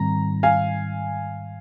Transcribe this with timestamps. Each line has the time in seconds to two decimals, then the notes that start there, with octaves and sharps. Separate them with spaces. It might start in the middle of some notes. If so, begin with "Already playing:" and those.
Already playing: G#2 D#3 G3 C4 A#5
0.43 F5 G#5